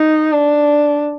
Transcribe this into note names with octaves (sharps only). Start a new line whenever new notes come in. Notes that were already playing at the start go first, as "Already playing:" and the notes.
Already playing: D#4
D4